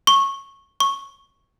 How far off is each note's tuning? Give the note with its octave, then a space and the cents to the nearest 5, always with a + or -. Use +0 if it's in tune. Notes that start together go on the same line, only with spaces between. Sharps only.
C#6 -15
C#6 -5